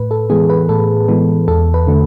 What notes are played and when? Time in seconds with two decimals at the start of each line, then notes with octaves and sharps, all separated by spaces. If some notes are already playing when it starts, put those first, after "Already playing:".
Already playing: A2 B4
0.11 A4
0.30 E3 G#3 B3 G#4
0.50 B4
0.69 A2 A4
1.08 E3 G#3 B3
1.48 E2 A4
1.74 B4
1.87 D3 A3